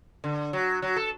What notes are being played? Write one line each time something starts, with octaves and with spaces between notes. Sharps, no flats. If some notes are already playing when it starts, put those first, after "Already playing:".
D3
F#3
F#3
A4